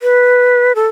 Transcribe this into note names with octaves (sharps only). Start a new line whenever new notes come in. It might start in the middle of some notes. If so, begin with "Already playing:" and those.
B4
A4